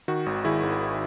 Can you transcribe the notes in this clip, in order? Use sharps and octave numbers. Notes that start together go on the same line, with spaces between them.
D#3 F#4
G#1
G#1 E4 G#4
G#1